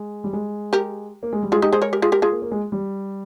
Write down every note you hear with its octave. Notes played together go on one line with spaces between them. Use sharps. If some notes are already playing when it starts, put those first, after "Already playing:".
Already playing: G#3
G3
G#3
G4 A#4
A#3
G#3
G3
G#3 F4 G#4
D#4 G4
G#4 C5
A#4 C#5
G4 A#4
F4 G#4
G4 A#4
F4 G#4
A#3
A#3
G#3
G3